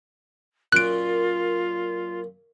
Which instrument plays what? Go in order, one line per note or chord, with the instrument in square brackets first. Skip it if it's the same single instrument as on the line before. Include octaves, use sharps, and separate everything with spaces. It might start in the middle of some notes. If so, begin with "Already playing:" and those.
[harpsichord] F#2 A#2 [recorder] F4 [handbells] F#6 D7